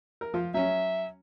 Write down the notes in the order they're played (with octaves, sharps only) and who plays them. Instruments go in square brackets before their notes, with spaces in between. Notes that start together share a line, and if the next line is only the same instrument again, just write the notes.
[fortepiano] A#4
F3 F4
[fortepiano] F#3 C#4 [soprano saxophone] E5